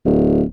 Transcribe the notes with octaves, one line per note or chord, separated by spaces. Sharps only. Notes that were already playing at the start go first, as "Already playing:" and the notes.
D1